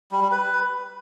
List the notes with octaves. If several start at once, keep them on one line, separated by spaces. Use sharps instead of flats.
G3
G3
B4